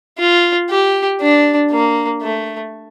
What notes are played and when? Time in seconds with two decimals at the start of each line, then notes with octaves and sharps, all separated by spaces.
0.18 F4
0.70 G4
1.20 D4
1.71 A#3
2.22 A3